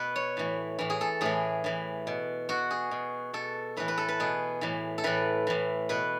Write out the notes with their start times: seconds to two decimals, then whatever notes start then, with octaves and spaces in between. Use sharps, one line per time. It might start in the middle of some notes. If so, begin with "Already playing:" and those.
Already playing: B2 B4
0.16 C#5
0.37 A2 E3
0.79 A2 E3
0.90 G#4
1.01 A4
1.21 A2 E3 G#4
1.64 A2 E3
2.07 B2
2.49 B2 F#4
2.71 G#4
2.91 B2
3.34 B2 A4
3.77 A2 E3 B4
3.88 B4
3.98 A4
4.09 B4
4.20 B2 G#4
4.61 A2 E3
4.98 A4
5.04 A2 E3 B4
5.47 A2 E3
5.89 B2 B4